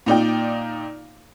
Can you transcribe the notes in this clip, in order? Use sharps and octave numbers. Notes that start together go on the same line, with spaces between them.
A#2 D#4 D5 G5